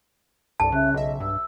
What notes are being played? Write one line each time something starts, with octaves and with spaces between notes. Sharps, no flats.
C2 G2 A4 D5 A5
C#3 C#4 E5 F#6
B1 D#5 E5
G2 E6